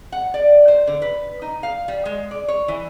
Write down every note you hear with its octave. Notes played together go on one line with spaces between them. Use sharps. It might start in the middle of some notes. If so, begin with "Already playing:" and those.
F#5
D5
C5
D3
B4
D#4
F5
G3
G#3
D5
C#5
E3